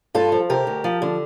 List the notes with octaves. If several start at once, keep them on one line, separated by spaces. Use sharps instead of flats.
G2 F4 A4
F3
C3 G4 A#4
D2
F3
D3